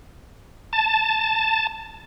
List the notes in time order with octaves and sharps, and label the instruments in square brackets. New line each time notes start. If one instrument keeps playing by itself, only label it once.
[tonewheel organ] A5